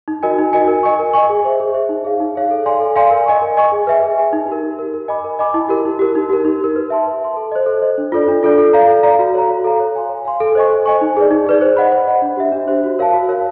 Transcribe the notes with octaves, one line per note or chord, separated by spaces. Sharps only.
D#4
F#4 A#4 D#5 G#5
D#4
F#4 A#4 D#5 G#5
A#4
D#5 G#5 C#6
A#4
D#5 G#5 C#6
G#4
C5 E5
G#4
C5 E5
D#4
G#4 C#5 F5
D#4
G#4 C#5 F5
A4
D5 F5 G#5 C6
A4
D5 F5 G#5 C6
A#4
D#5 G#5 C#6
A#4
D#5 G#5 C#6
G#4
B4 E5 G#5
G#4
B4 E5 G#5
D#4
G4 A#4
D#4
G4 A#4
A#4
D#5 G#5 B5 D6
A#4
D#5 G#5 B5 D6
E4
G4 A#4
E4
G4 A#4
D#4
G4 A#4
D#4
G4 A#4
B4
E5 A5 C6
B4
E5 A5 C6
A4
C5 D#5
A4
C5 D#5
D4
F4 A4 D5
D4
F4 A4 D5
A4
D5 F5 A#5
A4
D5 F5 A#5
F#4
A4 C#5 F5 A#5
F#4
A4 C#5 F5 A#5
C#5
F5 G#5 C6
C#5
F5 G#5 C6
A4
C5 D#5 G#5 C#6
A4
C5 D#5 G#5 C#6
D#4
G#4 B4 D5
D#4
G#4 B4 D5
C5
D#5 F#5 B5
C5
D#5 F#5 B5
D4
G4 C5 E5
D4
G4 C5 E5
F#4
A#4 C#5 F5 A5
F#4
A#4 C#5 F5 A5